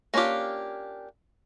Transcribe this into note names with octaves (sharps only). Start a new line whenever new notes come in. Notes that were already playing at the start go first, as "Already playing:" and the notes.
A#3 C#4 D4 F4 G4